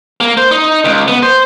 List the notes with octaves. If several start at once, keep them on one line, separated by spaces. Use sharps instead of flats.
A#3
C5
D#4
C#2
B3
C5